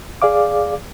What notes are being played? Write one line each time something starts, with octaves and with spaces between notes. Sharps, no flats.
G#4 D5 F5 D6